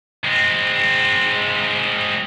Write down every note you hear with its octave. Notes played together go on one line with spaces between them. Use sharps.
G#3 C4